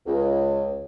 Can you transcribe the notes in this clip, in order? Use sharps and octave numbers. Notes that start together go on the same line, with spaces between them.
C#2